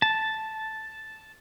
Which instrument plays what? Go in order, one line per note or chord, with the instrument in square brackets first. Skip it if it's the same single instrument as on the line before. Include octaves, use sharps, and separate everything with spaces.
[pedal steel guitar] A5